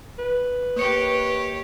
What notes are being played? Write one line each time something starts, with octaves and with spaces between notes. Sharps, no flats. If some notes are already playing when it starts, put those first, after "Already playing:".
B4
A#3 G4 C#5 C#7